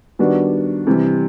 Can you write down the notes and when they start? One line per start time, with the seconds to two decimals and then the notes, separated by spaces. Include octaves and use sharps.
0.19 D#3 G3 B3 D4 F#4
0.87 C3 E3 G3